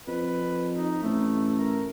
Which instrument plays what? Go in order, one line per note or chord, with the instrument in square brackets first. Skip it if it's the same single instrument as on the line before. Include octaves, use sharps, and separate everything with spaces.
[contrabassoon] F2 [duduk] B4
[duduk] D#4
[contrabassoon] A1 [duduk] A3
[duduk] A#4